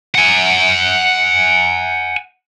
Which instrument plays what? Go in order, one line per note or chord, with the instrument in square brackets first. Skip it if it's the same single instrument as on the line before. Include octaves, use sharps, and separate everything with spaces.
[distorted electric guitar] F#5 G#5